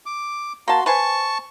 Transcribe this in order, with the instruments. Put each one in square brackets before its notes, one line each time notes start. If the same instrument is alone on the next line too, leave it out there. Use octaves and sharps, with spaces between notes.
[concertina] D6
[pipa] A#3 A5 [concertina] F#4 C6
[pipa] B4 C5 G#5 [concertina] A5 C#6